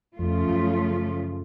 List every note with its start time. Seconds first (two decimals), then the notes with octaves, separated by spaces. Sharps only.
0.18 F2 C#3 F3 A3 F4
0.47 F#2